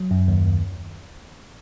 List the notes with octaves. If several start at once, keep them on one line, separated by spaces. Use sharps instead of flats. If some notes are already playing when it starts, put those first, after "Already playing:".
Already playing: F#3
F#2
D#2
D#2